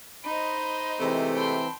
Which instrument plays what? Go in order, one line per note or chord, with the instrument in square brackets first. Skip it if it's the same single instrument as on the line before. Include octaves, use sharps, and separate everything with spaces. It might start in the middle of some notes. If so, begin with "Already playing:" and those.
[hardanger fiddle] D#4 C5 [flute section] D#5 B5
[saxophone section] C3 G#3 A3 [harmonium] E3 C4
[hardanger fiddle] G5 C6 [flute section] A5 B5